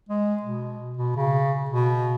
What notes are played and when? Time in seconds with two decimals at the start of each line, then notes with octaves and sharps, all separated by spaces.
0.09 G#3
0.43 B2
0.97 B2
1.16 C#3
1.70 B2